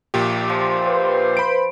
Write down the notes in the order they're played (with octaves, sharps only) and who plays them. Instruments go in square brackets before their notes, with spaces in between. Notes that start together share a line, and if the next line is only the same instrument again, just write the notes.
[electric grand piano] A#1 A#2 G4
[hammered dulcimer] F3
[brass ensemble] B4 C5
[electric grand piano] B5 D7